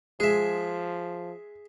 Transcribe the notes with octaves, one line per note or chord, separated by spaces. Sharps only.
F3 G#3 G#4 E5